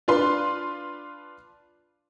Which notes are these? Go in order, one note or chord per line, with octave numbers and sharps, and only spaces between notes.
D4 F4 B4 C6